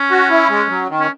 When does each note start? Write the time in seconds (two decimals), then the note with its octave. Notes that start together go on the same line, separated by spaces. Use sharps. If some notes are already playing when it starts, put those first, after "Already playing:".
Already playing: C#4
0.10 F#4
0.30 E4
0.50 G#3
0.70 F#3
0.89 D#3
1.00 C#4